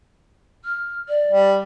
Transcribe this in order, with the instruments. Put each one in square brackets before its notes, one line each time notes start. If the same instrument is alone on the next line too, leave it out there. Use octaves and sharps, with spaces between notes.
[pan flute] F6
D5
[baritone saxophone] G3